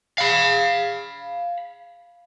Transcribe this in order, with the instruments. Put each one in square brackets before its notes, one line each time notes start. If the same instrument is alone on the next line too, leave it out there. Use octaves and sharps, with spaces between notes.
[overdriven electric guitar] F5 B5